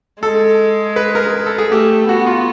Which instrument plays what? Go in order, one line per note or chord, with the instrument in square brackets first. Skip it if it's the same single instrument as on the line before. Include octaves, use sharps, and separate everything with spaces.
[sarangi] G#3 [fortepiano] A4
[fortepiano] B4
A#4
A4
G#4
[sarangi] A3 [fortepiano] G4
[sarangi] B3 [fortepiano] F#4
[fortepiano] F4